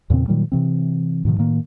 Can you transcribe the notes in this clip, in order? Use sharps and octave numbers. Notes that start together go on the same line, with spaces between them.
E2 A#2 C#3 C4
A#2 D#3 F#3 G3
C3 E3 C4
G#2 B2 D#3 F3
A2 D#3 A#3